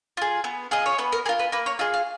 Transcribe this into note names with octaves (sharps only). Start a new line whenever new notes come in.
F4 G#4
B3
F4 G#4 D#5
C#5
B3 B4
A#4
G#4 A#4
F4
B4
A#3 B4
C#5
F4 G#4 D#5
F5